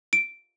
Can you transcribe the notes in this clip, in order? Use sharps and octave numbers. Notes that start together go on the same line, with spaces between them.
D7